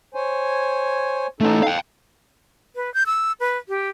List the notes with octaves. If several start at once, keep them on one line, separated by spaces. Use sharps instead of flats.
C5 C#5 G#5
A3 C#4 D#4 A4
F5 G5
B4
G6
E6
B4
G4